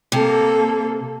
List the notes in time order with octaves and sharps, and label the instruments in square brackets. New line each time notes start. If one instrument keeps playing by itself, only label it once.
[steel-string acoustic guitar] C3 [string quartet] A#3 A4